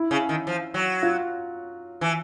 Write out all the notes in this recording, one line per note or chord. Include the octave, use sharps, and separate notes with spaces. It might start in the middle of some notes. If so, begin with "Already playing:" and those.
Already playing: E4
C#3
D#3
F3
F#3
F4
E3